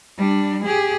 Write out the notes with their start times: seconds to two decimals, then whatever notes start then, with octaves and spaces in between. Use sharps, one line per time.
0.18 G3 D4
0.65 G4 G#4